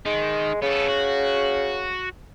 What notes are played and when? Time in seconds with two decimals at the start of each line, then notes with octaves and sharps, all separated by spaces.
0.06 D#3 G#3
0.62 C#3 B3 A4
0.88 F#4